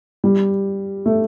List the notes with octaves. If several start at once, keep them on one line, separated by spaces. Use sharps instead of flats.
G3
A3